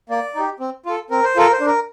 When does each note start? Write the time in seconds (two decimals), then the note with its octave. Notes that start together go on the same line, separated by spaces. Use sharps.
0.10 A#3 D5
0.35 D#4 G4
0.60 C4
0.86 F4 A4
1.10 C4 A#4
1.24 C5
1.36 F4 A4 A#4
1.52 C5
1.60 D4
1.66 A#4